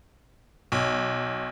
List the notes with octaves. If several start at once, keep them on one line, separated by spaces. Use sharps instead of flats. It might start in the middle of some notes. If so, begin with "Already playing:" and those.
B1